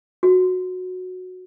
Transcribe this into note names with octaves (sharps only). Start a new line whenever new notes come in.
F#4